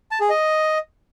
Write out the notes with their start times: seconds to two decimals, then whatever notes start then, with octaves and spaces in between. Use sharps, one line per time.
0.11 A5
0.20 G#4
0.30 D#5